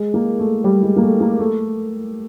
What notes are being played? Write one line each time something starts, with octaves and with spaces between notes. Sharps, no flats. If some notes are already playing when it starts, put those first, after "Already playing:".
Already playing: G#3
A#3
A3
G3
G#3
A#3
A3
A#3
A3